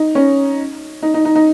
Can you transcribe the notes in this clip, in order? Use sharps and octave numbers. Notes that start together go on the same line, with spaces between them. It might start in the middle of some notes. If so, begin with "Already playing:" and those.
Already playing: D#4
C#4
D#4
D#4
D#4
D#4